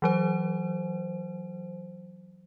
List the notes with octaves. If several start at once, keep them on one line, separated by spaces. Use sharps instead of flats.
E3 F#3 C5